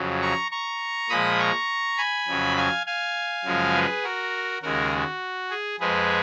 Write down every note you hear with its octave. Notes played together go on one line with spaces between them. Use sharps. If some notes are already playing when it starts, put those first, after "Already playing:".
Already playing: F2 C#3 F#3
A#5 C#6
A#5 C#6
A#2 F3 G#3 B5 D#6
A#5 C#6
G#5 B5
F2 C#3 F#3
F5 G#5
F5 G#5
F#2 C#3 F3 G#3
G#4 B4
F#4 A#4
D#2 C#3 G#3 F#4 A#4
F#4
G#4
F2 F3 G#3 G#4 B4